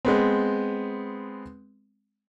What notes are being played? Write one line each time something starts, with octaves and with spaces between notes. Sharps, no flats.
G#3 B3 C4